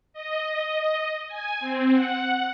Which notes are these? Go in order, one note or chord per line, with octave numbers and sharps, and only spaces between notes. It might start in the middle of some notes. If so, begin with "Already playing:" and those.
D#5
G#5
C4
F#5